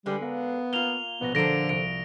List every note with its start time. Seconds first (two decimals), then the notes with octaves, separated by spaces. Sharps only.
0.06 D3 G3 G#3 B4
0.22 B3 A#4 F5 F6
0.73 A#3 F4 F7 G7
1.21 A#1 B2 B3 A#6
1.35 D3 F3 A4 A#4 C5 A#6 D7
1.69 C2 D7